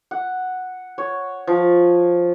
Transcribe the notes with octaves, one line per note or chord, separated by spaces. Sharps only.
F#5
C#5
F3